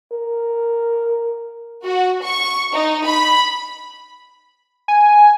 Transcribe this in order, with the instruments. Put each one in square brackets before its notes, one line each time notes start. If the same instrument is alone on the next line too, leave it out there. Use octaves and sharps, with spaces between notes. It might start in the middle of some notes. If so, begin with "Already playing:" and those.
[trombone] A#4
[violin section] F#4
C#6
D#4
B5
[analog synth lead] G#5